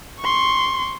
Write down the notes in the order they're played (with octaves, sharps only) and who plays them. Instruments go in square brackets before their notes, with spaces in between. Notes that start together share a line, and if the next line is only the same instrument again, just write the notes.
[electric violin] C6 C#6